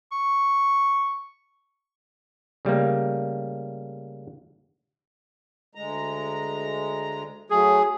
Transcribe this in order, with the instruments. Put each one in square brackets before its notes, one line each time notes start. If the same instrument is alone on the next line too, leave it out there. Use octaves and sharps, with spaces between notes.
[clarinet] C#6
[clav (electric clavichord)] C#3 G3 A3 A#3
[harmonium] D2 G#3 A#5
[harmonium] F#3 A3 [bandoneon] G#4